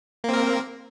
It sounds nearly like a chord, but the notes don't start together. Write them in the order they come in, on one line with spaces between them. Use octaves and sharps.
A#3 C4 A#4